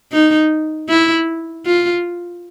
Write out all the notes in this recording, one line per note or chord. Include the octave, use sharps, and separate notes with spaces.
D#4
E4
F4